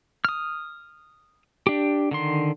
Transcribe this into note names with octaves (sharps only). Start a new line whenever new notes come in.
D#6 F6
D4 G4
D3 D#3 C6